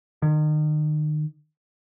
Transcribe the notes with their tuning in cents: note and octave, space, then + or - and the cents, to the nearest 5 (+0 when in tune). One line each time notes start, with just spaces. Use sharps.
D#3 -35